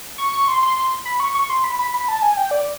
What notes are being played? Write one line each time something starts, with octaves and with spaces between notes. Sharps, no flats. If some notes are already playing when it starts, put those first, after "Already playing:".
C#6
C#6
C6
C6
C6
B5
C#6
C#6
C6
B5
B5
B5
A5
G#5
G5
D5